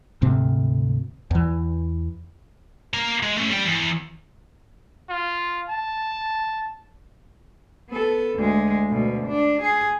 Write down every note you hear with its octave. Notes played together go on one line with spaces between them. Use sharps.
D2 G#2 C3 C4
E2 E3
A#3 A#5
G#3
A3 C#4
G3 G5
E2
F4
A5
B3 A4
D2 G#3
D2 B2
D4
G#4